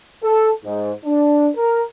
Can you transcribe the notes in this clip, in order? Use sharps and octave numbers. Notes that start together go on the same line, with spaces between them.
A4
G#2
D4
A#4